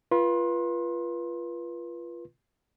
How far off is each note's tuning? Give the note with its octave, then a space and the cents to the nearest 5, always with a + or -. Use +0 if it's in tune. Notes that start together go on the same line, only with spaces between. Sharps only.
F4 -20 B4 -30 C6 +25